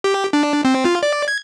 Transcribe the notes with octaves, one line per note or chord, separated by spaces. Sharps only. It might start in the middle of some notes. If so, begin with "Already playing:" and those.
G4
D4
C4
F4
D5
G#6